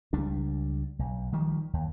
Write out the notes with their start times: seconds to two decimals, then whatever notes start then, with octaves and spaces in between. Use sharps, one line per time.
0.13 C#2 G3 D4
0.99 B1
1.32 D#3 F3 G3
1.73 D#2